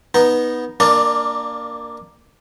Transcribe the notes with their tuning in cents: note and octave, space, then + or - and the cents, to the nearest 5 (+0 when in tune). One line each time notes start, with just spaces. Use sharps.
B3 -10 D#4 +0
A#3 +0 D4 +0 D5 +30